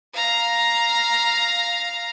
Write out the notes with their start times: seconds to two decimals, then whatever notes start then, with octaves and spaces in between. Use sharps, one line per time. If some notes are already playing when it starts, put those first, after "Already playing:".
0.14 F5 A#5